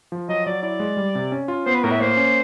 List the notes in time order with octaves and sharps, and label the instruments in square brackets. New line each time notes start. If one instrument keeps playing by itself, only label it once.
[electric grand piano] F3
[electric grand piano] F#3 [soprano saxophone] D#5
[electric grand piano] F#3 [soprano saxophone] D5
[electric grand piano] E4 [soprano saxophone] D5
[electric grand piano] G#3
G3
C3
C#4
F4
[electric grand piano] B3 [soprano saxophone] C5
[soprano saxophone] B4
[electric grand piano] A2 [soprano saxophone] A#4
[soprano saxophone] E5
[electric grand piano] A#3 [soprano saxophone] C5
[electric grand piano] C#4